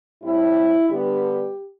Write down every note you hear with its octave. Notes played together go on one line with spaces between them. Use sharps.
A2 G3 C4 E4
G2 D3 G3 B3 G4